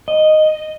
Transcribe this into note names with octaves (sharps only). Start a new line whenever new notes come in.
D#5